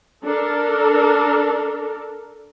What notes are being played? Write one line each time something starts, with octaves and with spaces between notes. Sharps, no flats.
D4 A4 A#4